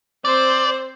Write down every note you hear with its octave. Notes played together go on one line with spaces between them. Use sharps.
C4 C5 D5